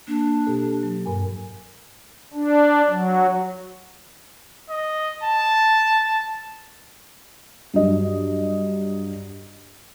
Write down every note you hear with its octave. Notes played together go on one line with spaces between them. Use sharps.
A#3 D4
B2 G4 A4
F#3
G2 A#4 G#5
D4
F#3
D#5
A5
G2 F#3 D#5